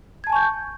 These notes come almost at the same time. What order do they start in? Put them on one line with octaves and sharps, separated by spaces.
G#6 A5 G#5 C#6 G6